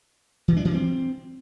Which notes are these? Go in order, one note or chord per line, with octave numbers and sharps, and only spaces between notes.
E3
D4
E3
C4